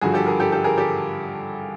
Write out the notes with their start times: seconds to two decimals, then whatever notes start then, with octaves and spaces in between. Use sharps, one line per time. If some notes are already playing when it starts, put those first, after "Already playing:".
0.01 G2 D3 F3 F#4 G#4
0.14 G4 A4
0.26 G#4 A#4
0.40 G4 A4
0.52 G4 A4
0.64 G#4 A#4
0.78 G4 A4